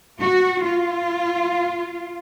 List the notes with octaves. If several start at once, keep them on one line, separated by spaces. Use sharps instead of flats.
F#4
F4